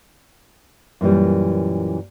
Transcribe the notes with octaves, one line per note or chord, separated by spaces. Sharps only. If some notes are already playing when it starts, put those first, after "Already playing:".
F#2 A#2 E3 G3